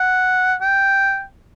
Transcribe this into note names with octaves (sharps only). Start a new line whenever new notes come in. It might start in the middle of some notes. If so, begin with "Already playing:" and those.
Already playing: F#5
G5